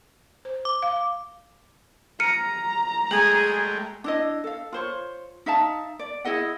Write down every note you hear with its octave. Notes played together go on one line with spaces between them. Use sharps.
C5
D6
F5
A#5 F6 C#7 D#7
G#3 A3 G#4 G5 F#7
D4 E4 D#5
A4 F5
F4 C5 C#5
D#4 E5 F5 A5
D5
E4 G#4 D#5 F#5